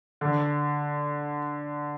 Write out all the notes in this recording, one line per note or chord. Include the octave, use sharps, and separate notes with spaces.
D3